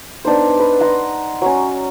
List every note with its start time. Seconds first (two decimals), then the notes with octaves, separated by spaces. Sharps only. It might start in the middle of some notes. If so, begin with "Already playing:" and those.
0.25 B3 D4 D#4 C5
0.59 B4
0.80 F#5 A#5 C6 D#6
1.41 F#3 C#4